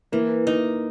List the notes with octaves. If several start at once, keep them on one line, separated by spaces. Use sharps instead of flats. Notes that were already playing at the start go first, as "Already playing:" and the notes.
E3 A#3
A#3 D#4